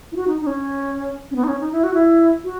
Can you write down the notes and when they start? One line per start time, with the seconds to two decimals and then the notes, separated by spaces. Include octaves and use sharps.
0.12 E4
0.16 F#4
0.28 D#4
0.41 D#4
0.47 C#4
1.31 C#4
1.36 B3
1.44 D#4
1.48 C#4
1.61 D#4
1.72 E4
1.84 F#4
1.94 E4
2.44 F#4